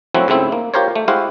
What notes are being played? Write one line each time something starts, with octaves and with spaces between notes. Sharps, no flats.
F3 F#3 A3 C4 E4 F#4
G#2 C#3 A3 C4 E4
A#3
F4 G4 A#4 C5 C#5
A3
G#3 E4 F#4 G4 C5 F5